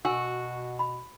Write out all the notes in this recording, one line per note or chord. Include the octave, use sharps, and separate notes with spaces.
B2 F#4 A#4 G#5 E6
B5